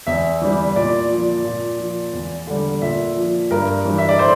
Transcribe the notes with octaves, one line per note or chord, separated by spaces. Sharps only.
E2 E5
E3 G3
A#2 D5
F3
A#2
F3
E2
D3 G3
A#2 E5
F3
G2 A#4
E3 G3
E5
D5
A2 C5